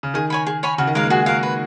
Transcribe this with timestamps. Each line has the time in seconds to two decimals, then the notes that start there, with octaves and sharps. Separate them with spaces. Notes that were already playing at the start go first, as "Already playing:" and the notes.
0.03 C#3
0.14 D#3 G#4
0.30 C#5 G#5 B5
0.47 G#4
0.63 C#5 G#5 B5
0.78 C#3 F#4
0.87 D#3
0.95 G#3 A#4 F5
1.03 A#3
1.10 F#4 G#4
1.26 F#4 A#4 F5
1.43 B4